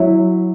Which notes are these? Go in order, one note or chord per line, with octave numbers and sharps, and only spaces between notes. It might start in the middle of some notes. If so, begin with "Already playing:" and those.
Already playing: F#3 E4